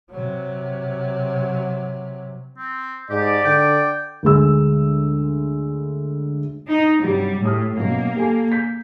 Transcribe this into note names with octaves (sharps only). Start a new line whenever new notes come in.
C3 F#3
C4
G#2 G4 D5
D3 G5
D2 G#3 E6
D#4
G2 C3 F#3 G3
A2 G4 D#6 F6
F#2 B2 A#3
G4 A4 G#5
G6 B6